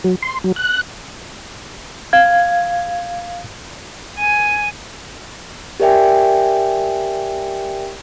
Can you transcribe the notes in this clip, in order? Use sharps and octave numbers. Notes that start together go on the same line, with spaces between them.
F#3
C6
F#3
F#6
F5 G#6
G#5
G4 A#4 D5 E5 G5 G#5